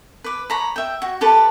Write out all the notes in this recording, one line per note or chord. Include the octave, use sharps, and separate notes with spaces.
B4 D6
C#5 A#5 B5
E5 G5
F#4
G4 A4 B4 A5